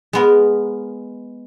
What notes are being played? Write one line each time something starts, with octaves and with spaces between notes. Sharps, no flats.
G#3 B3 A#4